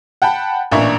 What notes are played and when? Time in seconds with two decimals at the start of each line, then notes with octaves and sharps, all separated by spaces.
0.22 F#5 G5 A5 B5
0.72 A1 A#2 D4 E5 A#5 C#6